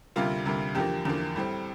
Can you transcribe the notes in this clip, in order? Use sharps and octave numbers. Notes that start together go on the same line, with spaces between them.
D2 C3 G3 A#3 F4
D2 C3 G3 A#3
E2 D3 F3 A#3 G4
E2 D3 F3 A#3
A2 G3 C4